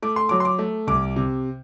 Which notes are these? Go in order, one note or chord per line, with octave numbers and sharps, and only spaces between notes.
A3 D6
C6
F#3 D6
C6
D6
A3
C2 D6
C3